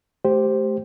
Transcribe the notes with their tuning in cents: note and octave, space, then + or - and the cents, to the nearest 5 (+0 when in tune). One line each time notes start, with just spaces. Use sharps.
A3 -30 G4 +0 C5 +0